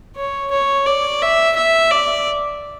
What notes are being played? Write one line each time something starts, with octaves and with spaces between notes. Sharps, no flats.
C#5
C#5
D5
E5
E5
D5